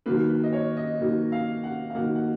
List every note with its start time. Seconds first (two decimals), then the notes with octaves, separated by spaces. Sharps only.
0.06 D#3 F#3 A#3 B4
0.29 B4
0.44 D#5
0.53 C#5
0.77 D#5
1.01 D#3 F#3 A#3
1.32 F5
1.63 F#5
1.90 F5
1.95 D#3 F#3 A#3 F#5
2.15 F#5